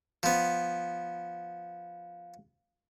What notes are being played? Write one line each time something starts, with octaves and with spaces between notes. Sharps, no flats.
F3 B3